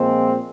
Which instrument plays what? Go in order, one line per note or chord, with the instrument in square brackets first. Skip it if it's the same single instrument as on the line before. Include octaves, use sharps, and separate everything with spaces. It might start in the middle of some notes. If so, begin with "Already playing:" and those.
Already playing: [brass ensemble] A#2 F3 G#3 C4